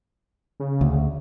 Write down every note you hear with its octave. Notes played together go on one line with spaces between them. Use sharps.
C#3
D2